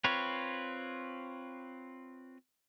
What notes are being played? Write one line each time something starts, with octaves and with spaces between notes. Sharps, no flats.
C4 F4 B4 C#5